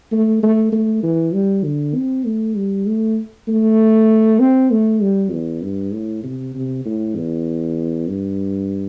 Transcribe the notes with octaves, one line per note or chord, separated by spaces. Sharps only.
A3
A3
A3
E3
G3
D3
C4
A3
G3
A3
A3
C4
A3
G3
E2
G2
A2
C3
C3
A2
E2
G2